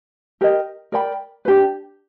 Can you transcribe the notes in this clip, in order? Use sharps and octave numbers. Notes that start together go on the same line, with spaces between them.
G4 A#4 D#5
A#4 D5 G5 B5
B4
D4 G4